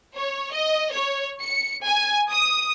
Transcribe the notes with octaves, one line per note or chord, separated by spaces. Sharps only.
C#5
D#5
C#5
C#7
G#5
D#6